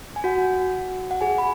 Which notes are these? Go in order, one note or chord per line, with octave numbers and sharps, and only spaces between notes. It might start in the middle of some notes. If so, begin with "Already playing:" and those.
G#5
F#4 F#5
F#5
G#4 G#5
B5